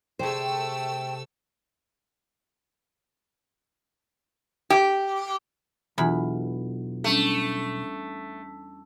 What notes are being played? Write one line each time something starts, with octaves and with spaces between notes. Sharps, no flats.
C3 A3 G#4 C5 G5 E6
G4
B1 E2 D4 F4 E5 B5
G3 A3 C#4 D4